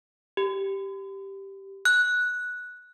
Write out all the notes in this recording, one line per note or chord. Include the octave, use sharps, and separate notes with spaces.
G4
F#6